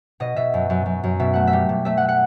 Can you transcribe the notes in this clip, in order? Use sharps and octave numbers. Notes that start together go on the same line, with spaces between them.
B2 D#5
B2 E5
F#2
F#2
F#2
F#2
B2 E5
A3 F#5
E5
G3
B2
A3 E5
F#5
F#5